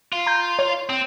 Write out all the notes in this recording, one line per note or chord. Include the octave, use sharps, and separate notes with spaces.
F4
A#5 G6
C#5
C4